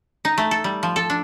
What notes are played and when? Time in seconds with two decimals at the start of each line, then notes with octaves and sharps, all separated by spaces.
0.25 D#4
0.38 A3
0.51 A4
0.64 G3
0.83 F3
0.96 A4
1.10 D4